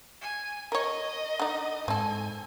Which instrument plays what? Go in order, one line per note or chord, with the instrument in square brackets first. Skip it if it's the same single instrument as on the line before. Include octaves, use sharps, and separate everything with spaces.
[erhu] G#5
[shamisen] A#4 C#5 [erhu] D#5
[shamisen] D3 D#4
[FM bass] G#2 [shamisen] C4 A4 [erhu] G#5